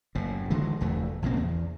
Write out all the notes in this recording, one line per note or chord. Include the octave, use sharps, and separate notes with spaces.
F#1 A2
D3 E3 F#3 G#3
F1 E2 A3
A#1 C#3 A#3 C4
E2